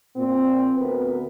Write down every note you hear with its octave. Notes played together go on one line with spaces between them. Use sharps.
A#2 C4
D2 B3 A#4 B4